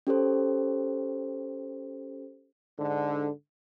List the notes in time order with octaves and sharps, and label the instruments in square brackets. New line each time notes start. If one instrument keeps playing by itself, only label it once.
[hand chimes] C#4 G4 A4 C5
[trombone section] G#2 D3